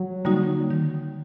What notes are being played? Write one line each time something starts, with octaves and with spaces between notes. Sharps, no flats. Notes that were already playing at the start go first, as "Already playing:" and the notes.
Already playing: F#3
D3 G3 A#3 D#4 F#4
D#3 G3